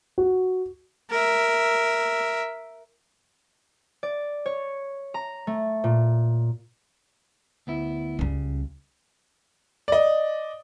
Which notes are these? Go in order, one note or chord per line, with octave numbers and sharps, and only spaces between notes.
F#4
A#4 E5
D5
C#5
A#5
A3
A#2
D2 B3 E4
C#2 C#3 G3
D5 D#5